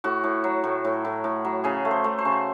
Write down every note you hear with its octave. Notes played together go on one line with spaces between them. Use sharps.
A2 F#4
A2
F#3
A2
A2
A2
A2
F#3
C#3 G#4
A3
C5
A3
C5
C#3